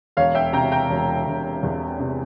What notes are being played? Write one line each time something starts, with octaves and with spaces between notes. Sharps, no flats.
E1 C#5 F5
E5 G5
C3 G5 A#5
G5 A#5
E1
E1
E2
C3